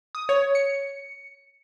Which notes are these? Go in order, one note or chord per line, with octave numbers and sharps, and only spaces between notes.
D#6
C#5
C#7